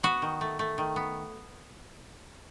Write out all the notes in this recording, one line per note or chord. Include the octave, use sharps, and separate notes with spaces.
B3 F#4
D#3
A3
A3
D#3
B3